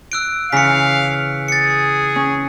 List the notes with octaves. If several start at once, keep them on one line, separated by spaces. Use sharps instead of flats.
E6 F#6 D7
C#3 E3 F5 B6 C#7
G#4 A6 C#7
C#4